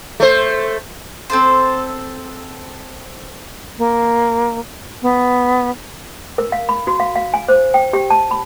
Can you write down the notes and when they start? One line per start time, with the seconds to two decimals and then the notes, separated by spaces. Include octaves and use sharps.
0.20 A3 C5
1.30 C4 A4 C5
3.78 A#3
5.02 B3
6.38 A#4
6.52 F5
6.69 B5
6.87 F#4
7.00 F5
7.16 F5
7.34 G#5
7.48 C5
7.74 G5
7.93 G4
8.10 A5
8.31 B5